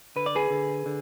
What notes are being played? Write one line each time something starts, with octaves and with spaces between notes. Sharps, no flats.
D3 B4
D5
G#4 B4
D3
D3